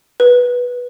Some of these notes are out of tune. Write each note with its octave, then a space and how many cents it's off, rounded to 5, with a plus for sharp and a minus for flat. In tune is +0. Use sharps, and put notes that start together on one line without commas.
B4 -10